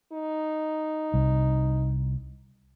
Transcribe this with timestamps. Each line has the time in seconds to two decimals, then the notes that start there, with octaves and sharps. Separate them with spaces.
0.13 D#4
1.14 C2